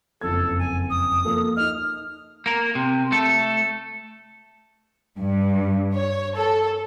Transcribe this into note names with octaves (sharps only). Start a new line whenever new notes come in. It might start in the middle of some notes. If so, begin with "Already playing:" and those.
F#1 F2 A4 G#6
G#5
D#6
F3 A#3 A4
D#4 D#5 F6
A#3 A#4
C3
A3 A4
G2
C#5
A4